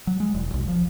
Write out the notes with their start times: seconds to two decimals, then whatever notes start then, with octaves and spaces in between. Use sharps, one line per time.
0.07 F#3
0.20 G#3
0.34 E1
0.54 B1
0.68 F3